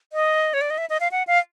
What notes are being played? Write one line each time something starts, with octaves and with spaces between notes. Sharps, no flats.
D#5
C#5
D5
D#5
E5
D#5
F5
F#5
F5